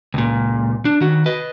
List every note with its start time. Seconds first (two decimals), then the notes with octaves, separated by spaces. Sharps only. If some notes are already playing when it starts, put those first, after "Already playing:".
0.14 C#2 A#2
0.85 D4
1.01 D#3 F#4
1.26 B4 D#5